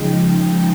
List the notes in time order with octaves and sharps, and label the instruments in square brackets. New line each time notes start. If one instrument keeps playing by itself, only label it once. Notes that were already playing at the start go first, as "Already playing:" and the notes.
Already playing: [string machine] C#3 F3 G#3 D#4 G5
G5